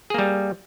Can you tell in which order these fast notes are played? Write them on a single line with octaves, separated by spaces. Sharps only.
G#4 A#3 G3